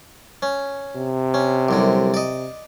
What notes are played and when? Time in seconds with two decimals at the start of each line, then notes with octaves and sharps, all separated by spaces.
0.42 C#4
0.95 C3
1.34 C#4
1.69 C2 F#2 D3
2.14 D5 D#5